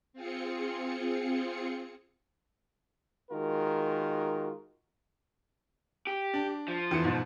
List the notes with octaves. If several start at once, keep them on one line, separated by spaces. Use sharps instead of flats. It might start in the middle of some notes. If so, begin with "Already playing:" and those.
C4 F4 G#4 C#7
D#3 G#3 F4 F#4 A#4
G4
D4
F3
E2 E3 C#7
G#2 B2